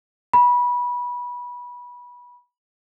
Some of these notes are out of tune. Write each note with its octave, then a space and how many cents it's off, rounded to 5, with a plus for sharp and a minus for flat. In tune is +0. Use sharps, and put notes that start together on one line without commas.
B5 -20